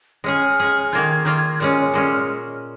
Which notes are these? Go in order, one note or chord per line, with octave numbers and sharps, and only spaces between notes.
G#3 C#4 G#4 F6
G#3 C#4 G#4
D#3 A#3 F4 G#6
D#3 A#3 F4 F6
G#6
G#6
A#2 G#3 C#4 F6
A#2 G#3 C#4